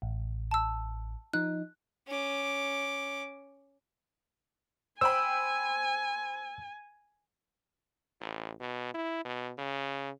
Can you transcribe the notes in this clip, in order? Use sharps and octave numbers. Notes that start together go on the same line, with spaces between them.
A1
A5 E6
F3 D#4 F#6
C#4 D6
C5 G5 G#5 B5 E6
A1
B2
E4
B2
C#3